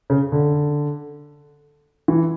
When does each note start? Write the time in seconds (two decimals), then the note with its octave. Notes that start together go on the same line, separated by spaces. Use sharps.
0.10 C#3
0.32 D3
2.08 E3